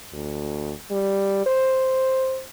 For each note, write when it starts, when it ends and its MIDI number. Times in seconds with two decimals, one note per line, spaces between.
0.13 0.72 38
0.91 1.45 55
1.46 2.43 72